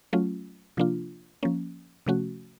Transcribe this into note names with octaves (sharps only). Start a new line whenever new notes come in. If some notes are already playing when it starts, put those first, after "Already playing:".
F#3 A3 C#4 F4
C3 F3 A#3 D4 F4
F3 A#3 C#4
C3 F3 A3 C#4 F#4